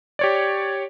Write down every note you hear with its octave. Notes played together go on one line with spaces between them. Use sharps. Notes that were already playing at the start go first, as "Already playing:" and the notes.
G4 C#5 D5